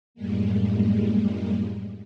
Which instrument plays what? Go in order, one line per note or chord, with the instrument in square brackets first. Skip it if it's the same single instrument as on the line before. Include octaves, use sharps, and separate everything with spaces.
[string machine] F#2 A2 G3 G#3 A#3